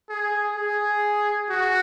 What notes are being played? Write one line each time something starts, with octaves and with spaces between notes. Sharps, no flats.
G#4
G#4
F#4